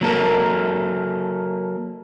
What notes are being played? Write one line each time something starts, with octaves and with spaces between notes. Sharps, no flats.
F#3 A#3 A4 A#4